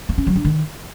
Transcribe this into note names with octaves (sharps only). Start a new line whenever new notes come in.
A#3
C#4
F#3
D4
D#3